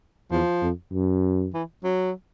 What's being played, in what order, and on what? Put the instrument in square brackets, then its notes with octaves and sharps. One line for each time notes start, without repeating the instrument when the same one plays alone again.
[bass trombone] E2 [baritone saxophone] F3
[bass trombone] F2
F#2
[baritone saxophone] E3
F#3